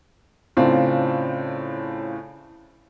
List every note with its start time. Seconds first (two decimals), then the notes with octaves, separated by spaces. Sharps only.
0.57 A2 C#3 C4 D4 F4